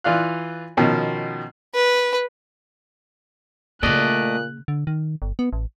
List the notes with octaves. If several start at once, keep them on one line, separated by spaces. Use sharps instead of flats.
E3 F4 D5 F5 F#6
B2 D#3 F3 C#4
B4
A#2 C#3 A3 A#3 D5 D#5 F#6
D3
D#3
G1
B3
A1